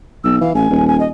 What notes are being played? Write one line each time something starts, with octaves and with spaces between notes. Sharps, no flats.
B1 E6
E3 F5
A1 G#5
D#1
G#5
D#5